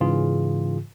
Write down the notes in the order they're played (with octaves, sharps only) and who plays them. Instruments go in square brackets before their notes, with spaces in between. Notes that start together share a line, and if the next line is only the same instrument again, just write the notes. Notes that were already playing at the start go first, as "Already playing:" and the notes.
[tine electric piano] G#2 C#3 E3 F4 G#4